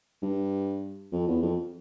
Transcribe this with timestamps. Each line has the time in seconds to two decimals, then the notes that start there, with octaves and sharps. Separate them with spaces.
0.22 G2
1.12 F2
1.28 E2
1.42 F2